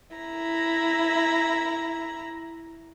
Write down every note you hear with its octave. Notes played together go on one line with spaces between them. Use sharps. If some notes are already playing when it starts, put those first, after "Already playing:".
E4 A#5